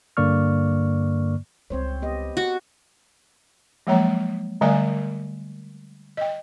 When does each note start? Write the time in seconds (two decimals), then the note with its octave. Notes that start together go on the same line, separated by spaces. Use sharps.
0.17 G2 D3 A#3 D5 C#6 F6
1.70 C#2 G3 C4 C5 C#5
2.02 B3 G4 D#5
2.37 F#4
3.87 F3 F#3 G#3 A#3 C#5 A#5
4.61 D3 G3 A3 A#4 D5 G#5
6.17 D#5 G5